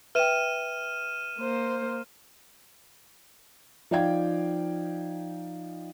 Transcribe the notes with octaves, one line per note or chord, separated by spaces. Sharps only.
B4 E5 G5 F6 D#7 E7
A#3 C5
F3 D#4 D5 F5 G5 G#6